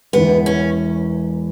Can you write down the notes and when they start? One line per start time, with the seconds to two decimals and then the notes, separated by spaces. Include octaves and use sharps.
0.13 E1 E2 E3 B3
0.46 C#4